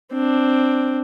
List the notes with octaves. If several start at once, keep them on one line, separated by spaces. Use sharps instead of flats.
C4 D4